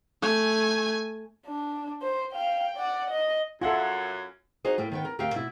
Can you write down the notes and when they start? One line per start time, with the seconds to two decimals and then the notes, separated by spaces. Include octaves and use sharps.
0.22 A3 G#5
1.47 D4
2.02 C5
2.32 F5 G5
2.77 D5 F#5
3.10 D#5
3.61 F#2 F4 A4 E5 F#5 G#5
4.65 D#4 F#4 G#4 C5 D#5
4.78 A2 A#3 G5
4.91 D#3 B3 G5
5.05 A#4
5.19 D2 G4 A#4 E5 F5 G5
5.34 B2 E4